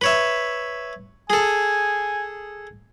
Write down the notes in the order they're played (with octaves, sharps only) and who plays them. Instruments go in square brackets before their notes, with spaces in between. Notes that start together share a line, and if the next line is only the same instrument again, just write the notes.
[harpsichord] B4 C#5 E5
[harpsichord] G#4 A4 [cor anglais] G#5